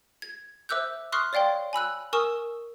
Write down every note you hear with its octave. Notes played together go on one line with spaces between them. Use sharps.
G#6
C5 E5 D6 E6 F#6 G6
C6 C#6 D#6 F6 F#6 C7
C#5 D5 F5 G5 C6
G#5 B5 E6 F#6
A#4 G#5 C#6 D#6 E6 E7